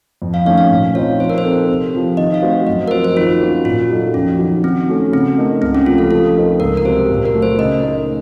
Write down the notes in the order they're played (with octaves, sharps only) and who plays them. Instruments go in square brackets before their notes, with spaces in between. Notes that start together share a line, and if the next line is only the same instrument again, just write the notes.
[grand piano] F2
[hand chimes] F5
[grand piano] D#3 A3 C#4 [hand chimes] F5
[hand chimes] F5
[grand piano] A#2
[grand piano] F3 C4 D#4 [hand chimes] C#5
[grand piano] F3 [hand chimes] C5
[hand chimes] A#4
C5
[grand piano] C4 D#4 A4
C3
F3 C4
[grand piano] D#3 [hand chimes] D#5
[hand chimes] F5
[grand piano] A3 C4 F#4 C5
[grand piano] F#2 [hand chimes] D#5
[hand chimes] A#4
[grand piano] F3 C4 F#4 [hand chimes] C5
[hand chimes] C5
[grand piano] D#3 [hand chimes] F4
[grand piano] A#3 C#4 F#4 C5
[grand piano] A#2 [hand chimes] F4
[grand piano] F#3 A#3 D#4 A4
[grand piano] F2 [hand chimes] C#4
[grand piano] D#3 F#3
[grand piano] D#3 [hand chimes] C4
[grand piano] A3 C#4 F#4 A4
[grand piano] C#3 [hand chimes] C4
[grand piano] A3 D#4 A#4 D#5
[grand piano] C#2 [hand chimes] C4
[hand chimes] C#4
[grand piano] C3 F3 A3 [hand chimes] F4
[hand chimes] A4
[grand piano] F3 [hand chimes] A4
[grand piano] C4 D#4 A#4
[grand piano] C#2 [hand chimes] A#4
[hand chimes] A#4
[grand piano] C3 F#3 [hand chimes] C5
[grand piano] A#2
[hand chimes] A#4
[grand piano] F#3 A3
[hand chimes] C5
[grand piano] C#3 [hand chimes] D#5
[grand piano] A3 D#4 A#4 D#5